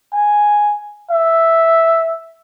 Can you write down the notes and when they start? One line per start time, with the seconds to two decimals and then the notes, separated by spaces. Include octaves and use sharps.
0.13 G#5
1.11 E5